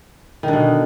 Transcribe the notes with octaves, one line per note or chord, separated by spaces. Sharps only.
B2 D3 D#3